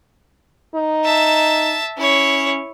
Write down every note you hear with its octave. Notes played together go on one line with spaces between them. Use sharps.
D#4
E5 A5
C#4 E4 C#5